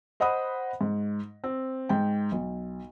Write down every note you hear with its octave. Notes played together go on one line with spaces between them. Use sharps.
C5 D#5 F#5 B5 D#6
G#2
C4
G#2 G5
B1